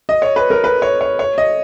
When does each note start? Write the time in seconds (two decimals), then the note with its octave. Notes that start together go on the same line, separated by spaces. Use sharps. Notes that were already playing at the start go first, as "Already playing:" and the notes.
0.09 D#5
0.22 C#5
0.36 B4
0.50 A#4
0.64 B4
0.82 C#5
1.01 C#5
1.19 C#5
1.38 D#5